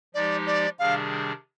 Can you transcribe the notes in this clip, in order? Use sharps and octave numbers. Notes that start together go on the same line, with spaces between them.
F3 G#3 D#4 G4 D5
D5
C3 D#3 G3 D4 G#4 F5